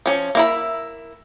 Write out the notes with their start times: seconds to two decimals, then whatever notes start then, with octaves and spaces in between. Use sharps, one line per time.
0.06 F3 C#4
0.35 A#3 E4 B5